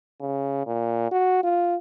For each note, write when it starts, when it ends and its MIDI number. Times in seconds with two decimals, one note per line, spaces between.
0.21 0.64 49
0.67 1.09 46
1.11 1.43 66
1.43 1.76 65